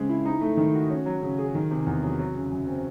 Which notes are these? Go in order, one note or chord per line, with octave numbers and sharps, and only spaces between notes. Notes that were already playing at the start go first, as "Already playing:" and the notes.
Already playing: C#3 G#3 C4
E4
D#4
A3
D#3
F#4
C#4
F#3
C#3
G#4
D#3
C3
E2
F#3
F#3
C#3
F#2
C4